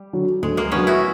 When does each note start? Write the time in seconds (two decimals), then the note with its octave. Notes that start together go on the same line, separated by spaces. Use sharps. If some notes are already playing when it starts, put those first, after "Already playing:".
Already playing: G3
0.13 D3 F#3
0.42 D2 G#3
0.57 G#3 A#3
0.72 D3 F#3 B3 C#4
0.87 E4 F#4